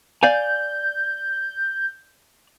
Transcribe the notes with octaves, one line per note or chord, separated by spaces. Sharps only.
D5 F5 G#5 G6